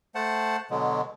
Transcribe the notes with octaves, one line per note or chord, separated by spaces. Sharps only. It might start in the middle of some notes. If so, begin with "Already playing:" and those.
A3 C5 F#5 A5
B2 D3 F#3 G#3